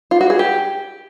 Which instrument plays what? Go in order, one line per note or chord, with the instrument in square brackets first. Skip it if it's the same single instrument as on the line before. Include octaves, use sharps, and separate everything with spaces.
[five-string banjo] F4
F#4
G#4
G4